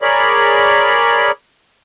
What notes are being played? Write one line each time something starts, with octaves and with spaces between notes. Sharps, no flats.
G#4 A#4 C#5 D5 B5